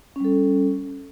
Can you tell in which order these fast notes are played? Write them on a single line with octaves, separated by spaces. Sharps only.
C#4 G3 A4